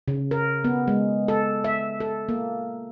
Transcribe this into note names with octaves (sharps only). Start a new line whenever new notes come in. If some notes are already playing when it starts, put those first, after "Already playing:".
C#3
A#4
B3
G#3
A4
E5
A4
A#3